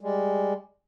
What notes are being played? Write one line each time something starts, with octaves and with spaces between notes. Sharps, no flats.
G3 G#3